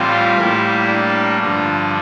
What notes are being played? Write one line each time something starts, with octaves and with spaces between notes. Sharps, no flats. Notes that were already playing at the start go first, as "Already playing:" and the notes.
Already playing: A2 E3 G3 C4 F4
A2 G3 A#3 E4
D4
G2 D3 F3 D4